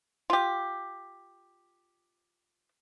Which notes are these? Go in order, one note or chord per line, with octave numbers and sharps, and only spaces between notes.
F4 G4